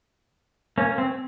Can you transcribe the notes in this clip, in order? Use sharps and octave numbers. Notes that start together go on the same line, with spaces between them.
A#3 C#4
C4